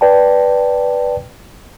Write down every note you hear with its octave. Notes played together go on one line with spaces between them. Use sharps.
B4 D5 G5 A5